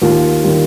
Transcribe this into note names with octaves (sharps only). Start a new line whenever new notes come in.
D#2 F4
D#3 G3